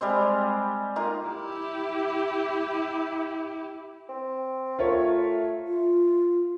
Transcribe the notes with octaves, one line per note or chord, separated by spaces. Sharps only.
G3 G#3 C4
A#3 D#4 F4 A#4
E4 G4
C4
A3 F4 A#4 C#5
F4